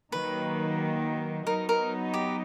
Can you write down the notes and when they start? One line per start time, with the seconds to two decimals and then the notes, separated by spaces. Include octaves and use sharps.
0.12 D#3 F#3 A#3 B4
1.47 F#3 B3 D#4 A#4
1.69 A#4
2.14 G4